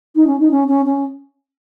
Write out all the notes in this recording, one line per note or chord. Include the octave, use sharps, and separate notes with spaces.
D#4
C#4
D#4
C#4
C#4
C#4